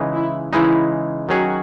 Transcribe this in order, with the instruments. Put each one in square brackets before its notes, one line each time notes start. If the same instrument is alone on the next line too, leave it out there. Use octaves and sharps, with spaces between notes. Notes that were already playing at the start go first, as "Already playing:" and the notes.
Already playing: [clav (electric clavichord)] C#3 E3 G#3 D#4
[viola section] E4
[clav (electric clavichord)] C#3 E3 G#3 D#4 [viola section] E4
[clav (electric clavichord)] D#3 F#3 C#4 G#4 C#5 [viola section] F#4